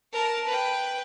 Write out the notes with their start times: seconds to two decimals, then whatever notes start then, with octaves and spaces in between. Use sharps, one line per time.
0.12 A#4 A5
0.46 B4 G5